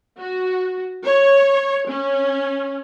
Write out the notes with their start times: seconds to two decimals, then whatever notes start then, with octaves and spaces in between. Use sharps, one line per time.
0.19 F#4
1.04 C#5
1.88 C#4